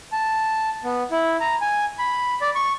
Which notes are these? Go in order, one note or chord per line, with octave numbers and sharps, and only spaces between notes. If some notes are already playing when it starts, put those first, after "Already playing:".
A5
B3
E4
A#5
G#5
B5
D5
C#6